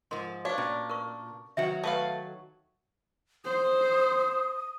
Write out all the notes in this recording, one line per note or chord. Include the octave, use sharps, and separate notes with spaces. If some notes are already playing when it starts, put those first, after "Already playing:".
G#2 F3 A#4 C6
D4 F#4 B4 C#5 F5
A#2 C#4
A#4 C#6
D#3 F#3 F#4 B4 E5
A3 B4 F5 A5
C5 D#6